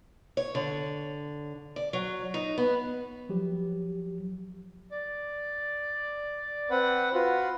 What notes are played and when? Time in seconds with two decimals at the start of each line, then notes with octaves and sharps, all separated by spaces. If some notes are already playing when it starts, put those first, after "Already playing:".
0.37 C#5
0.55 D3
1.76 D5
1.93 F#3
2.34 D#4
2.58 B3
3.29 F3 F#3 G4
4.92 D5
6.70 C4 B4 F#5
7.14 F4 F#4 B4